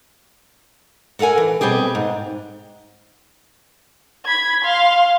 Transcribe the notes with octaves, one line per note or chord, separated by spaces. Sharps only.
F#4 A4 A#4 F5 G#5
E3
B2 G3 C4 G4 G#4
G#2
B5 G#6
F5 C6